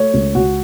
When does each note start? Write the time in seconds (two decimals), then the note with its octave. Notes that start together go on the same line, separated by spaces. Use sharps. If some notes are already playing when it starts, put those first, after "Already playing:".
Already playing: A3 C#5
0.14 C#2
0.35 C#2 F#4